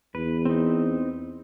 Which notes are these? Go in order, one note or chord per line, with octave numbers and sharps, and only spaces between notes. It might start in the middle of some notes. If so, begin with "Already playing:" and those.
E2 B4
C4 D#4